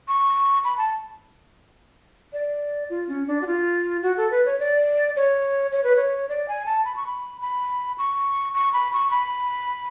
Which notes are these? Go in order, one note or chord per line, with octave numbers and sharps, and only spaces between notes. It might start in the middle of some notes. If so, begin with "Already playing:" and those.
C#6
B5
A5
D5
F4
C#4
D4
F#4
F4
F#4
A4
B4
C#5
D5
C#5
C#5
B4
C#5
D5
G#5
A5
B5
C#6
B5
B5
C#6
C#6
B5
C#6
B5